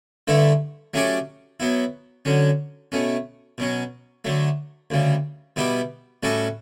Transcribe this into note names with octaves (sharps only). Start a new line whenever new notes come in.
G2 D3 A3 E4 A4
F#3 A3 C#4 G4 D5
F#3 B3 E4
D3 F#3 C#4
B2 A3 C#4
B2 F#3 C#4
D3 F#3 A3
D2 C#3 G3
B2 G3 B3 E4 G4
A2 G3 C#4 F#4 A4